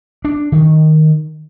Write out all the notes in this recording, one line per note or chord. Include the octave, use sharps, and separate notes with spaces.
D4
D#3